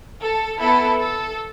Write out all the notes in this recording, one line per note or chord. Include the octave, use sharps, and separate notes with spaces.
A4
B3 E4 A4
A4